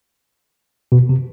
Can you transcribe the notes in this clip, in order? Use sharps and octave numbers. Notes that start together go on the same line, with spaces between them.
B2
C3